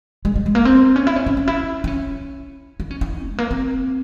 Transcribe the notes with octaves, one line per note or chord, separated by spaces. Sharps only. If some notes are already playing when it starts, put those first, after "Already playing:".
G#3
G3
G#3
A#3
C4
C#4
E4
C#4
C#4
C#4
E4
E4
C#4
E4
C#4
E4
G#3
A#3
C4